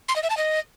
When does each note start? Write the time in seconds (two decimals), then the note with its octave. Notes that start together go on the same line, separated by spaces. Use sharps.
0.09 C6
0.16 D#5
0.23 E5
0.30 A5
0.37 D#5